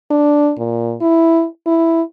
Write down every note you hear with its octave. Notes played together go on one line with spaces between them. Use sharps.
D4
A#2
E4
E4